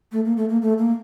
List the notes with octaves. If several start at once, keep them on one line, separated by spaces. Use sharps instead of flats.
A3
A#3
A3
A#3
A3
A#3